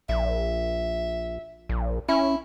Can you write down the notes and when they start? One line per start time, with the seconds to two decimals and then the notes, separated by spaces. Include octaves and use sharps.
0.09 A#1 E5
1.69 A#1
2.09 C#4 E4